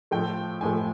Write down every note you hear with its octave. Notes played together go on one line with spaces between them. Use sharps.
A2 F3 A3 G5
A2 F3 A3 G#5